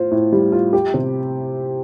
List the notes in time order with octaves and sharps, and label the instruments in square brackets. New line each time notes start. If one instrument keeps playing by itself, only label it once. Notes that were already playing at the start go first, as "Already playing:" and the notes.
Already playing: [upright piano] A2 F4 C5
A2
G3
F4
G4
C3